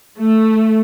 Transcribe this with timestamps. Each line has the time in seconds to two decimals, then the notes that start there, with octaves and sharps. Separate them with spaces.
0.19 A3